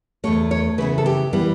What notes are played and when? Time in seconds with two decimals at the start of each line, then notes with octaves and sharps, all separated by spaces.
0.24 E2 B2 A3 C#5
0.51 C#5
0.78 C#3 E3 B3 B4
0.98 A4
1.06 G4
1.33 E3 G3 B3